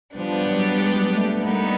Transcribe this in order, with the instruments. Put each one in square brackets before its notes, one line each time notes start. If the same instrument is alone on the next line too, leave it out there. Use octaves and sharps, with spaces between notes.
[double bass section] F3 [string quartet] G3 B3 D4 G4
[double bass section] F#3
G#3
A3
[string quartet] G3 B3 D#4 [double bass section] A#3